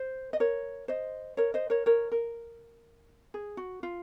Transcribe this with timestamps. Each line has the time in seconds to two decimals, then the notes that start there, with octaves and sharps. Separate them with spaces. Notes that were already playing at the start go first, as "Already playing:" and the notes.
Already playing: C5
0.33 D#5
0.40 A#4 C#5
0.88 C5 D#5
1.37 A#4 C#5
1.54 C5 D#5
1.70 A#4 C#5
1.86 A#4 C#5
2.12 A#4
3.34 G#4
3.57 F#4
3.83 F4